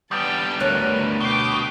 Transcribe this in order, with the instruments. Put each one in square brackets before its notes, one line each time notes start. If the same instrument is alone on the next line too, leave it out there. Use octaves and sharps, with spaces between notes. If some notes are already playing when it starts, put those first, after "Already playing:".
[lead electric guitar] G3 B3 [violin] G5 A5 [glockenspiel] D#6 G6 A6
[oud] D2 A3 C#5 [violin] A#4 [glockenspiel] F#6 D#7 F7
[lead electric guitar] B2 [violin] G5 D6 [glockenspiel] C7 G7